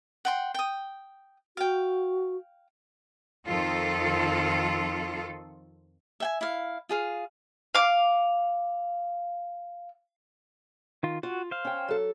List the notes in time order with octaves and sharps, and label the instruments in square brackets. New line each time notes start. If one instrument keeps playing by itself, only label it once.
[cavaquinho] F#5 G5 C6
G5 D#6
[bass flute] F#4 [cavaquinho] F5 G5
[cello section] F2 D#3 F4 A4
[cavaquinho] E5 G5 G#5
E4 F5
F4 G#4 F5
[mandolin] F5 D6
[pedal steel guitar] D#3 F4
[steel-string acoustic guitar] F4 [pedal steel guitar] F#4
[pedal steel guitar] C5 F5
[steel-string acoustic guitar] C#4 G5
F#3 A4